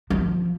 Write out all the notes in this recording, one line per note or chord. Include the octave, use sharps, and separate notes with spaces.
F3